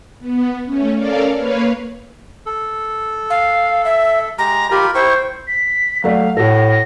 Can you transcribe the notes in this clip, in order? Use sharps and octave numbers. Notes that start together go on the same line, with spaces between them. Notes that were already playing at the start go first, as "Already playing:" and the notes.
B3
A3 C#4
C#4 A4 A#4 D5 F5
A#3 B4 C#5 F5
A4
F5
E5
G#3 G4 A#5
F4 G4 A#4 B5
E4 C5 G5 C#6
B6
F#3 A3 D5 F5
A2 F#4 A4 A#6